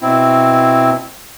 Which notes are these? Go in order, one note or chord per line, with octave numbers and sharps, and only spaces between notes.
B2 C4 E4